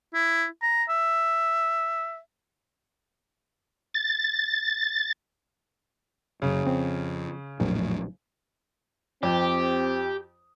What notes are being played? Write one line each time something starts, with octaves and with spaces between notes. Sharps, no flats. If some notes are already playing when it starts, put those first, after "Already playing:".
E4
A#5
E5
A6
F#1 F#2 C#3
F2 C4
A#1 F2 A2 F#3
F2 C4 G4